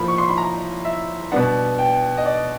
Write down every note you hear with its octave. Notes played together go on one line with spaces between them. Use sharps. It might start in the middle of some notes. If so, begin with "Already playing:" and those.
Already playing: A2 F3 A#3 B5
C#6
C6
B5
A#5
E5
B2 G3 B3 D4 F#5
G5
D#5
D5